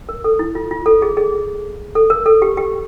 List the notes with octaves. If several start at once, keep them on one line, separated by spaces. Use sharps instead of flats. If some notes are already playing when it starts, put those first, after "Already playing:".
A#4
A4
E4
F4
F4
A4
G#4
G#4
A4
A#4
A4
G4
G4